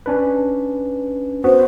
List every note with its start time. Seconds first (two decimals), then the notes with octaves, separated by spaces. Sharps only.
0.06 C#4 D4 B4
1.44 B3 F#4 C5